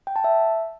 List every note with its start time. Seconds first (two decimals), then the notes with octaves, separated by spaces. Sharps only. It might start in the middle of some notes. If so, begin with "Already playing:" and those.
0.07 G5
0.16 A5
0.24 E5